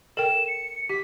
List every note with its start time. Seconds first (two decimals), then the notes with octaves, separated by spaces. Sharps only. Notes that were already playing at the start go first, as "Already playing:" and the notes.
0.17 A4 A#4 G5 E7
0.48 C#7
0.89 G4 B6